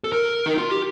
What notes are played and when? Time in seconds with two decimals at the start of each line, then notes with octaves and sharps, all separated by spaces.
0.04 A4
0.12 A#4
0.46 D#4
0.58 F4
0.70 G4